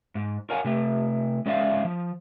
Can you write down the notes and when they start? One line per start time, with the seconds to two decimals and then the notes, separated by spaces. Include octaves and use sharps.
0.15 G#2
0.50 A#4 C#5 F5 F#5 G#5
0.65 C3 A3
1.46 G#3 C#4 D5 E5 F5
1.85 F3